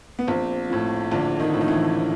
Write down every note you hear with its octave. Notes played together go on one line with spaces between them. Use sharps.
B3
A#1 C4
A2 F3
A#1 D3 D4
D#3 D#4
A2 F3
D#4
E3 E4